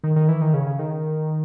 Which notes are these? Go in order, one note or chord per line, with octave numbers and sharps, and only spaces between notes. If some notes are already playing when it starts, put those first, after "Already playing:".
D#3
D#3
E3
D#3
C#3
C#3
D#3